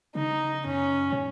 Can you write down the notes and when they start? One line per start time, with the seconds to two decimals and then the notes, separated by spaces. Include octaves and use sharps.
0.15 C#3 D#4
0.66 F#2 C#4
1.12 A#2